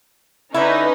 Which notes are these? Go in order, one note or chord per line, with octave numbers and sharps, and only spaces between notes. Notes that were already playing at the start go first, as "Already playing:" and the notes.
D3 C#4 D#4 E4 B4